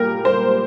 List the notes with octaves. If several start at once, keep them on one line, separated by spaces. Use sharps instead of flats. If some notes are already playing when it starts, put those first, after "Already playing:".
Already playing: A#2 G3 G4 A#4
C5